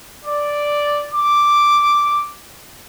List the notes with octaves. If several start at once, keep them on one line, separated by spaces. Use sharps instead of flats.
D5
D6